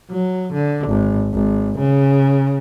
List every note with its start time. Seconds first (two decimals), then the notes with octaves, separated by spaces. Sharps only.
0.11 F#3
0.54 D3
0.88 G#1
1.34 G#1
1.79 C#3